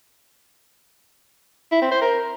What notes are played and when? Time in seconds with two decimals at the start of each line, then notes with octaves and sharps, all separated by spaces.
1.72 E4
1.82 C4
1.92 C5
2.01 A#4